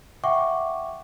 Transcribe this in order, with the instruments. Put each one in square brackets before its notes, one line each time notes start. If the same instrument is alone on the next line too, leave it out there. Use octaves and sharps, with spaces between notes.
[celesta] E5 F#5 G5 C#6 D6